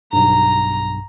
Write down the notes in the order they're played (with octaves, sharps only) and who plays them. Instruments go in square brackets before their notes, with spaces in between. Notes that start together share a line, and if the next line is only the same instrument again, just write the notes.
[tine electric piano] B1 G2 [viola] A#5